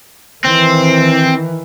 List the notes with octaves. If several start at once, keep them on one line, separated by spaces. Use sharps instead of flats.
D#3 E3 C4